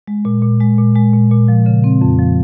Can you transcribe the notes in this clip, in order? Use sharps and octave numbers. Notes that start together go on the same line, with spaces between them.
G#3
A#2
A#2
G#3
A#2
G#3
A#2
A#2
F3
C#3
C4
F2
F3